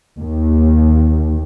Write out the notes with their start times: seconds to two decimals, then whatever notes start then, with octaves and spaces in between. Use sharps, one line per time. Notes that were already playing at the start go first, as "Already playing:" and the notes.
0.19 D#2